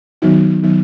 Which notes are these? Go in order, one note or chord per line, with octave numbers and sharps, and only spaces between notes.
D#3 F#3 B3 D#4 F#4
D#3 F#3 B3 D#4